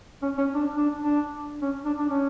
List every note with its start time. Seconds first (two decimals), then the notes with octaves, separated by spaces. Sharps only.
0.22 C#4
0.38 C#4
0.54 D4
0.77 D4
1.02 D4
1.62 C#4
1.85 D4
1.98 D4
2.09 C#4